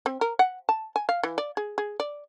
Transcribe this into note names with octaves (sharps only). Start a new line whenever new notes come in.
C4
A#4
F#5
A5
G#5
F5
E3
D5
G#4
G#4
D5